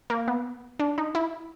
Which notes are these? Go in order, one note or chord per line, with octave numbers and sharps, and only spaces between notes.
A#3
B3
D4
D#4
E4